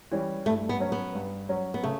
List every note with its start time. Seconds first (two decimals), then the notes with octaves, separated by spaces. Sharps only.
0.12 E3 G3 C#4
0.46 G2 A3
0.69 B3
0.80 F#3 C#4
0.92 B3
1.15 G2
1.49 F#3 C#4
1.74 B3
1.83 C#3 A3